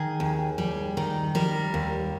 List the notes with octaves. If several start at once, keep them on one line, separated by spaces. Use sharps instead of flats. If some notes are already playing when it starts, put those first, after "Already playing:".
Already playing: D#3 G#4
D#2
G3
D#3
G3 A#4
D#2